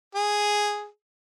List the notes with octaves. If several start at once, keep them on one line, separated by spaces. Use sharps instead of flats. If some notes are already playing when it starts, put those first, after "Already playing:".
G#4